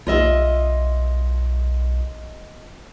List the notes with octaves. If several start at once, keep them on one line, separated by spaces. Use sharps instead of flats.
B1 F4 D#5 E5